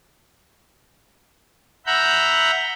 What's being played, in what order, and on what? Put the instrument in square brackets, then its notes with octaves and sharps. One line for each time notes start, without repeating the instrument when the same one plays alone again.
[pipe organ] E5 F#5 A#5 B5 G6